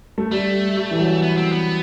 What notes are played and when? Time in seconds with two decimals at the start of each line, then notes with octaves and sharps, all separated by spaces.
0.18 A3
0.31 G3 A3
0.77 G3
0.91 E3
1.00 F#3
1.22 B3
1.37 C4
1.52 B3